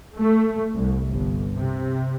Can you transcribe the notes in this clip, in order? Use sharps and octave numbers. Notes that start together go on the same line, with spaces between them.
A3
C2
G1
C3